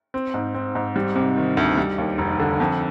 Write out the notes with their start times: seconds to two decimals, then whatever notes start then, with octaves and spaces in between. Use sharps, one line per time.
0.14 C4
0.34 G#2
0.54 C4
0.75 G#2
0.96 G3
1.15 C3
1.37 D#3
1.57 D2
1.78 G3
1.98 D#2
2.18 F1
2.39 D3
2.60 F2